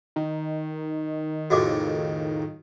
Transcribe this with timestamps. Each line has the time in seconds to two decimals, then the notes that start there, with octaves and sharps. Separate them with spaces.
0.16 D#3
1.50 F2 A2 C#3 F#4 D#5 D6